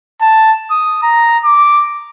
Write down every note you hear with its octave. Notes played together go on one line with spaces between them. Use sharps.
A5
D#6
A#5
D6